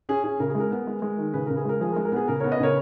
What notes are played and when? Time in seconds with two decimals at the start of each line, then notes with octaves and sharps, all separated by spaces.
0.09 C#4 G#4
0.24 C#4 G#4
0.40 C#3 A#4
0.50 G#4
0.55 G#3 A#4
0.71 B3
0.87 G#3
1.02 G#3
1.18 D#3
1.33 C#3 G#4 B4
1.46 C#3 A#4
1.57 G#4
1.65 G#3 A#4
1.80 F3 G#4
1.92 A#4
1.96 G#3
2.05 A#4
2.12 B3 G#4
2.28 C#3 A#4
2.40 B3 A#4 C#5
2.51 B4 D#5
2.60 C#3 A#4 C#5